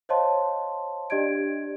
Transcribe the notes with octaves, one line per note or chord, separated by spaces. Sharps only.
C5 C#5 D#5 F5 A5 C6
D4 G4 D5 D#5 G#6 D7